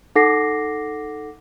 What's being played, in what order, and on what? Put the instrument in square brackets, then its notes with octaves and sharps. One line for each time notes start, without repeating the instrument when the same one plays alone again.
[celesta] D#4 A4 F#5 D6 A#6 C7